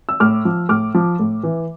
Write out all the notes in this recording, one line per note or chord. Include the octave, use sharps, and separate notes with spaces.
E6
A2 D6 F6
F3
A2 D6 F6
F3
A2
E3